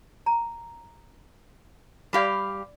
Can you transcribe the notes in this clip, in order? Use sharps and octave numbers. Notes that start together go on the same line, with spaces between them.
A#5
G3 G4 D5 F5 D6